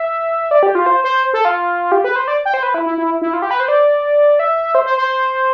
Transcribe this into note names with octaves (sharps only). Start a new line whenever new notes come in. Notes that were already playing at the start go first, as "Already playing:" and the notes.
Already playing: E5
D5
G4
F4
C5
C5
A4
F4
G4
B4
C5
D5
G5
C5
B4
E4
E4
E4
E4
F4
G4
B4
C5
D5
E5
C5
C5
C5